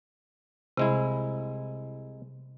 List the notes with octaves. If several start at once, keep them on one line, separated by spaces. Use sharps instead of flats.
C2 C3 G#3 E4